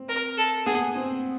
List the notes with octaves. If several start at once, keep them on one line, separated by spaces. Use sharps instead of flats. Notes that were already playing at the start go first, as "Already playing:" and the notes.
Already playing: C4
A#4
A4
B3 G#4
C4